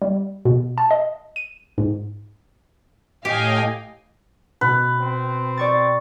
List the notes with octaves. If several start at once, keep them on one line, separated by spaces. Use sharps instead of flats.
G3
B2
A5
D#5
D#7
G#2
A2 G4 D#5 F5 G5 G#5
B2 B4
C4
D5 C#6 A6